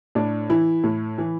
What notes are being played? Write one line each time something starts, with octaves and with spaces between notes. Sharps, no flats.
A2 D4
E3 E4
A2
E3